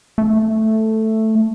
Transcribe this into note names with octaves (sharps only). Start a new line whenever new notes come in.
A3